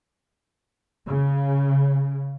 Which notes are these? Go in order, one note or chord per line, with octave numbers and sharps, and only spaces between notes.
C#3